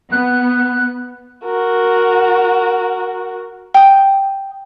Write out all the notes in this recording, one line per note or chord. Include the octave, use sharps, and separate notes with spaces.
B3 F#6
F#4 A#4
G5 D#6